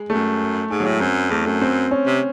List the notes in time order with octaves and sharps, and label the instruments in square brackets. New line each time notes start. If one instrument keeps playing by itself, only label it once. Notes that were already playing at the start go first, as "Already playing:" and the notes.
Already playing: [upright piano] G#3
[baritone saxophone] F#2 [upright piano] A3
[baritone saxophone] G#2 [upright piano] G#3
[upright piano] F#3
[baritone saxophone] A2 [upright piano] G#3
[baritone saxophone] F#2 [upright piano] C4
[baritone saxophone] E2 [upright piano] A3
[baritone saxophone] F#2 [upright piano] A3
[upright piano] C4
C#4
[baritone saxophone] C3